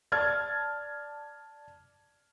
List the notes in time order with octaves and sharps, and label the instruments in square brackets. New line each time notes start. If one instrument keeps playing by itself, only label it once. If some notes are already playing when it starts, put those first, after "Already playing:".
[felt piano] D5 A5 F6 G#6 A6